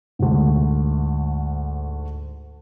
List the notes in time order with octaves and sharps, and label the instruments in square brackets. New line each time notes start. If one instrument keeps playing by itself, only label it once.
[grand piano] D2 G#2